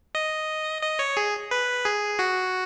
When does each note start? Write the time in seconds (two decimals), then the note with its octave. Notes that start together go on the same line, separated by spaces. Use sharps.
0.15 D#5
0.82 D#5
0.99 C#5
1.17 G#4
1.51 B4
1.85 G#4
2.19 F#4